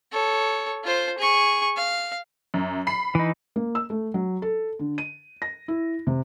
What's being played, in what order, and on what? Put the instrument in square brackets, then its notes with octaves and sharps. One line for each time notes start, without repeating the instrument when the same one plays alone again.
[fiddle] A4 C#5
F4 C5
G#4 C#6
F5
[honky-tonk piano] F#2
B5 C7
[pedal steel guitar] E3 D#4
[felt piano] A#3
E6
A3
F#3
A4
D3
D#7
A#6
E4
C3